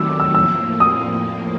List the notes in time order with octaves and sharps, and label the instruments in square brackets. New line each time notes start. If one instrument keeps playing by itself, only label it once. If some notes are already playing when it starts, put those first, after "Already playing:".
Already playing: [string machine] D#3 F#3 A3 [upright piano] D6 E6
[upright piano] E6
[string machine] A2 F3 A#3 [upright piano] E6
[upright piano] D#6